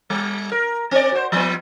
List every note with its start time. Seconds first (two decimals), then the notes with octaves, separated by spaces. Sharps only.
0.10 G3
0.52 A#4
0.91 C4 D5
1.12 F#4 C5
1.32 F3 G3 B3